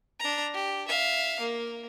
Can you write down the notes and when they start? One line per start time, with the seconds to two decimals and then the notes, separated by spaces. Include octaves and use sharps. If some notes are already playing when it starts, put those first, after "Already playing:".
0.20 D4 A#5
0.54 G4
0.88 E5 F5
1.40 A#3